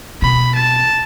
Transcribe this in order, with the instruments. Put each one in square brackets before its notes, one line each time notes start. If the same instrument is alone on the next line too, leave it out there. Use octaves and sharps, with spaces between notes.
[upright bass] B2 [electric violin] B5
[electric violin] A5